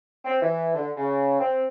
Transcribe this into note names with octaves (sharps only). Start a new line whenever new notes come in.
C4
E3
D3
C#3
C4